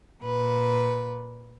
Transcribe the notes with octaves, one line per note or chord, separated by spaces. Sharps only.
A#2 B4